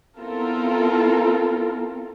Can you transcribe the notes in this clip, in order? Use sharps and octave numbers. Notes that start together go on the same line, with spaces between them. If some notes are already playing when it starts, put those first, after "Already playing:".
B3 C4 E4 F4 A4 A#4